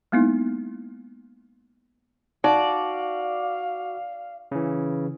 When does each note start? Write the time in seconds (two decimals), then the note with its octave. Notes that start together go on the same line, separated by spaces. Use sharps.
0.12 G#3 A#3 B3 D#4 E4
2.44 D#4 F#4 D5 F5
4.52 C#3 E3